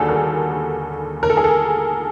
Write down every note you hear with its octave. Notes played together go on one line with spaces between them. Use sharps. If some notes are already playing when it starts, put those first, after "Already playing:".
Already playing: D#2 D3 G3 F#4 G#4 A4
A#4
A#4
A4
G#4
A4